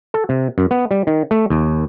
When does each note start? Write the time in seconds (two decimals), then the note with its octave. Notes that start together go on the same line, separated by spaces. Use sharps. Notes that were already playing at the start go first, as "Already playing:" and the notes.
0.14 A4
0.29 C3
0.58 F#2
0.71 B3
0.91 G3
1.07 D#3
1.31 A3
1.50 D#2